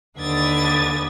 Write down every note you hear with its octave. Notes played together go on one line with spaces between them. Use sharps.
D#2 D3 B4 D#6 G#6 A6